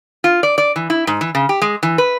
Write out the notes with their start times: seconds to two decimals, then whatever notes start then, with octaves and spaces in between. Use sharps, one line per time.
0.24 F4
0.43 D5
0.58 D5
0.76 E3
0.90 E4
1.07 G#2
1.21 E3
1.35 C#3
1.49 G4
1.62 G#3
1.83 E3
1.98 B4